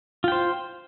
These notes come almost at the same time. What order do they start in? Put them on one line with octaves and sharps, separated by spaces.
F4 G5 C5